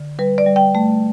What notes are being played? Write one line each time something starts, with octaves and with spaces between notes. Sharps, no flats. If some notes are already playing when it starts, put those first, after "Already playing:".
Already playing: D3
G3 B4
D5
G3
G5
A3